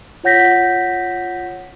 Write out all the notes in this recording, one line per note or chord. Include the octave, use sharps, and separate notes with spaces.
F4 C#5 F#5 G6 A#6 B6